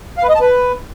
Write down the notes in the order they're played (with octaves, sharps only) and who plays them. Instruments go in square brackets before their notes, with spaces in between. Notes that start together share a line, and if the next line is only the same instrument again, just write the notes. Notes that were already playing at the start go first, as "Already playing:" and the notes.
[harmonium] F5
B4
D#5
A5
B4